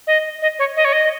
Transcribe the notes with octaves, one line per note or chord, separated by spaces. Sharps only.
D#5
D#5
C#5
D#5
C#5
D#5